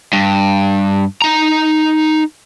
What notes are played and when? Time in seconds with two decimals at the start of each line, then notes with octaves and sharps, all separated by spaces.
0.13 G2
1.22 D#4 A#5